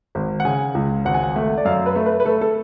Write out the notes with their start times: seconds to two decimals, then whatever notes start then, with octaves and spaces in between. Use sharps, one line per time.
0.15 G#1
0.40 F#5
0.45 C#3 G#5
0.75 C#2
1.05 G#1 F#5
1.14 G#5
1.24 F#5
1.36 A3
1.58 D5
1.65 F#2 F5
1.86 B4
1.96 A3
2.06 B4
2.20 B4
2.26 A3 A4
2.41 A4